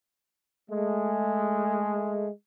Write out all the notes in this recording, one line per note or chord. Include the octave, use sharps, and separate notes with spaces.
G#3 A3